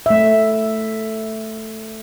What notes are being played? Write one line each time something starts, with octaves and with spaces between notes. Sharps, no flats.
A3 E5